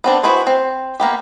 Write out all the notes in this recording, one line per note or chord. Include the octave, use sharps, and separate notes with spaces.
B3 C4 D4
E4 F#4 G#4 B4 C5
C4
A#3 B3 G4